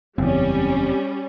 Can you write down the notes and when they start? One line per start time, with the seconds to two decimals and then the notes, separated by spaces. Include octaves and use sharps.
0.18 F#1 E2 G3 C4 C#4